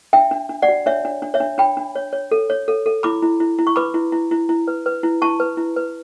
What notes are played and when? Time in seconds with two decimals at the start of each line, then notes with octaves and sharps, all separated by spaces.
0.13 D4 E5 G5
0.31 D4
0.49 D4
0.62 D5 F#5
0.68 F#4
0.86 D4 C#5 E5
1.05 D4
1.22 D4
1.34 C#5 E5
1.40 D4
1.58 D4 G5 B5
1.77 D4
1.96 C#5
2.13 C#5
2.31 A4
2.50 C#5
2.68 A4
2.86 A4
3.03 E4 B5 D6
3.23 E4
3.40 E4
3.59 E4
3.67 C#6
3.76 B4 B5 D6
3.94 E4
4.12 E4
4.31 E4
4.49 E4
4.68 B4
4.86 B4
5.03 E4
5.22 E4 A5 C#6
5.40 B4
5.57 E4
5.77 B4